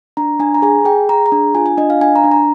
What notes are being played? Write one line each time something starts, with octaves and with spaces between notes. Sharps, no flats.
D4 A#5
D4 G#5
A#5
G#4 G#5
G#4 G5
G#4 A#5
A#5
D4
F4 G#5
G#5
D4 D#5
F5
D4 G#5
A#5
D4
A#5